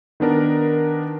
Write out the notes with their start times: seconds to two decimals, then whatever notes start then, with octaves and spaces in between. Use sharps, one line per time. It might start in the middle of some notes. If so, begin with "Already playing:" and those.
0.20 D#3 B3 D4 A#4